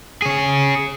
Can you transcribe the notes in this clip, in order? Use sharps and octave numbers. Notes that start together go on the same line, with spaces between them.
C#4 G#4